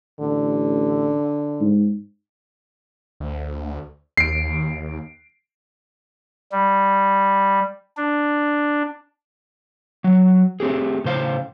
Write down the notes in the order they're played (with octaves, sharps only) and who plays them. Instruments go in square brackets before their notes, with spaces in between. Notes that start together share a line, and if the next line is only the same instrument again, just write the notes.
[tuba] A1 [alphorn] D3
[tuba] G#2
[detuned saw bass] D2
[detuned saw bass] D#2 [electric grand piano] C7 D7
[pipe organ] G3
D4
[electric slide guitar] F#3
A3 C4 G4 G#4
A2 C#3 C5 F5